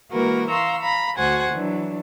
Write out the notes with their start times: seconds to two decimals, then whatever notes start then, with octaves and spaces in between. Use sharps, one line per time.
0.12 E3 G#3 A#3 F#4 A#4 B4
0.49 F5 A#5 C6 C#6 E6
0.81 F5 A#5 B5
1.18 D2 F#4 C5 F#5 G#5
1.51 E3 F#3 D4